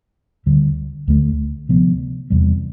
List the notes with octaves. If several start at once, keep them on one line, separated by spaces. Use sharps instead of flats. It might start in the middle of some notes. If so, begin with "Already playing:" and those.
D2 D3 G3
D2 D3 A3
D2 C3 F3 B3
E2 C3 G3